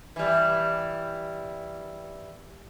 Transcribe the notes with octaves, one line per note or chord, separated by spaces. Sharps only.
E3 G3